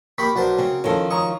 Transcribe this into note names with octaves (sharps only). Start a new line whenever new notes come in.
A#3 G4 B5 C#6 B6
B1 D4 F#4 A#4 C5
C#3 C4
D#3 F3 C#4 A4
C#5 A#5 C#6 D#6